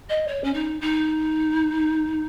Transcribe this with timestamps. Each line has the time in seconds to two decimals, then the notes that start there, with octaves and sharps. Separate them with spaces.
0.09 D#5
0.27 C#5
0.43 C#4
0.53 D#4
0.81 D#4